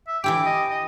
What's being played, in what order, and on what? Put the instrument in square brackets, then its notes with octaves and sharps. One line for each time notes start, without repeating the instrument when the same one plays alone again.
[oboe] E5
[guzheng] E3 E4 G4 [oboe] D6
[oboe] D#5
D#5